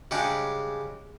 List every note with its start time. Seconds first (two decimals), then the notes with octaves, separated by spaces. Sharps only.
0.11 C#3 G3 G#3 D4 G4